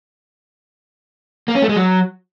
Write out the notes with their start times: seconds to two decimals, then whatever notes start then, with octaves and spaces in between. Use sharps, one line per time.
1.48 A#3
1.55 C#4
1.62 A3
1.69 G#3
1.76 F#3